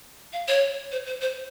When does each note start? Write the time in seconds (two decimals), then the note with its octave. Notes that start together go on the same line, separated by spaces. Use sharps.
0.33 F5
0.48 C#5
0.92 C5
1.07 C5
1.21 C5